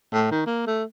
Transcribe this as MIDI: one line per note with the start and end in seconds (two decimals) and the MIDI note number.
0.13 0.28 45
0.31 0.45 51
0.46 0.64 58
0.67 0.84 57